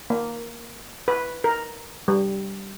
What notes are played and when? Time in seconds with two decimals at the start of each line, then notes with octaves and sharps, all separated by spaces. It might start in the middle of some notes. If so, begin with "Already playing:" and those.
0.10 A#3
1.08 B4
1.44 A#4
2.08 G3